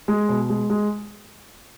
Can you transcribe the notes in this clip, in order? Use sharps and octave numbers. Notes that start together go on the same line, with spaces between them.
G#3
B2
G#3
G#3